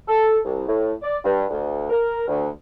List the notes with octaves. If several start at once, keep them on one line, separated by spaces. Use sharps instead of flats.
A4
C2
A2
D5
G2
D2
A#4
D2